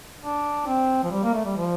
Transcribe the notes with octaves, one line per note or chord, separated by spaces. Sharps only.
D4
C4
F3
G3
A#3
A3
G3
F3